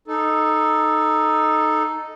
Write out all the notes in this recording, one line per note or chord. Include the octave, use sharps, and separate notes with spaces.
D#4 A4